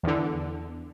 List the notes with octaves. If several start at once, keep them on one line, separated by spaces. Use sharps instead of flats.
E2 D3